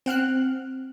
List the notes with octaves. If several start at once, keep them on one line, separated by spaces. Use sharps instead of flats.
C4 F#5 F6 F#6